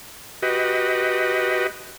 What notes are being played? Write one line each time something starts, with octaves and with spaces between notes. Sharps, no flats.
F#4 G4 B4 D#5